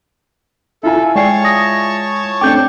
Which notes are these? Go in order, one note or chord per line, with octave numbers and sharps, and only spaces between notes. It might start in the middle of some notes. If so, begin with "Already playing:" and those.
E4 F4 A4 G#5
G#3 C#5 D5 G5 A5 C#6 C7
D#6 A#6
A3 C4 D4 G5 D6 G6